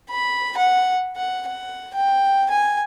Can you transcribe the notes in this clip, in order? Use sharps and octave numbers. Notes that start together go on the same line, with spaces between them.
B5
F#5
F#5
F#5
G5
G#5